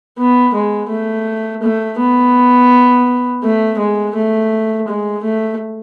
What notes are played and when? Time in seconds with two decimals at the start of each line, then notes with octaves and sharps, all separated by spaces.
0.18 B3
0.54 G#3
0.90 A3
1.62 A3
1.99 B3
3.43 A3
3.78 G#3
4.15 A3
4.87 G#3
5.23 A3